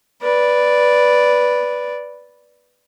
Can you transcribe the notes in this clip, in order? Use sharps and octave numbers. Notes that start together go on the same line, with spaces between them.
B4 D5